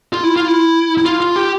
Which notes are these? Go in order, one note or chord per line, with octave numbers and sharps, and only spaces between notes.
F4
E4
F4
E4
E4
F4
F4
G4